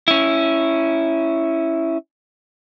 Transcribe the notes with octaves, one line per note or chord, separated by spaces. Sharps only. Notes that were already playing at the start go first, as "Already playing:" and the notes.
C#4 E4